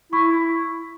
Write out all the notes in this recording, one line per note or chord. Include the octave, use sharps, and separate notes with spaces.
E4 C#6
E4